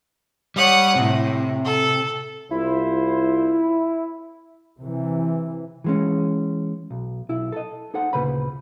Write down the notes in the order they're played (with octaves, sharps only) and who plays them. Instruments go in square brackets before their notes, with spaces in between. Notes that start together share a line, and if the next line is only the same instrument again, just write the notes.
[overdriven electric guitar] G3 [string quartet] C#5 F#5 D#6
[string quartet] A2 [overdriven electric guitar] C3
[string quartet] A4
[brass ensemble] C2 F4 C5 [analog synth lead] E4
[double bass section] C3 E3
[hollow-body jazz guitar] E3 G#3 C#4
B1
B1 E4
A4 D#5
D#4 A4 C5 F#5
D2 A#2 C#3 B4 C5 B5